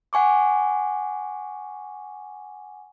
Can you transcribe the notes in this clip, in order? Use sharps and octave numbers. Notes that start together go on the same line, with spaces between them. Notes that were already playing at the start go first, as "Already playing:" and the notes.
F#5 G#5 C#6 D6